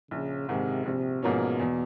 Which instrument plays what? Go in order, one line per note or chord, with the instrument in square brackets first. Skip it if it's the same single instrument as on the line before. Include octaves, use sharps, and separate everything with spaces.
[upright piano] A#1 [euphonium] C#3
[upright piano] G#2 D#3 G#3 [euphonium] C3
[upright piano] A#1 [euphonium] C3
[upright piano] G#2 F3 A#3 C#4 [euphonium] B2
[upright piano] E2